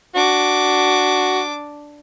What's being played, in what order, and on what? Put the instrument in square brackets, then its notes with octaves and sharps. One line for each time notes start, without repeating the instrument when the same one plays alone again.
[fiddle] D4 D6 [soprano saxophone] F#4